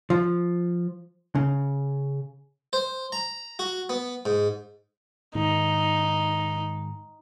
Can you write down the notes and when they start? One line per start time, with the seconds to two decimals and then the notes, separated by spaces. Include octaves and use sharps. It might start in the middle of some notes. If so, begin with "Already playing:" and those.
0.10 F3
1.35 C#3
2.73 C5
3.12 A#5
3.59 F#4
3.89 B3
4.26 G#2
5.35 G#2 D#3 D#4